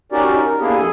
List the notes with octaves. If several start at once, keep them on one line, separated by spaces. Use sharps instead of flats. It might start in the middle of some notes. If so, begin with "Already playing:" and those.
C#4 D#4 F#4 G4 A#4 D5
D#4
A#4
A#3 B3 D4 E4 G4 G#4
F2 G#4 A4 G#5